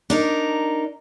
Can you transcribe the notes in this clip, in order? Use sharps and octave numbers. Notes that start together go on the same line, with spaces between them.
D4 D#4 A#4